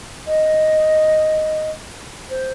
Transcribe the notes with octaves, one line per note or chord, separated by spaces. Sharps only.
D#5
C5